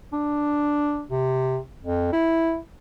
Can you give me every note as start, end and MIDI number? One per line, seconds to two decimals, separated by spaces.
0.13 1.04 62
1.10 1.58 48
1.84 2.11 41
2.12 2.57 64